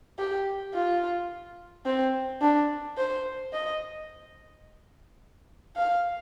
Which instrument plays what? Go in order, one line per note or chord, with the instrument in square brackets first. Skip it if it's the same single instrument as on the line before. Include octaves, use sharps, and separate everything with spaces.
[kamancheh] G4
F4
C4
D4
C5
D#5
F5